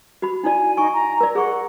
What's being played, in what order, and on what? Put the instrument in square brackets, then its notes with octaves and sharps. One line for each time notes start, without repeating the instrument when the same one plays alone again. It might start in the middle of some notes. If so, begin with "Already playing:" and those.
[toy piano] F#4 B5
[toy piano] D#4 E4 D5 [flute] G#5
[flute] D#4 [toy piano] G#5 C#6
[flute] A#5
[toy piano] A#4 D5
[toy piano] G#4 C#6 [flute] F#5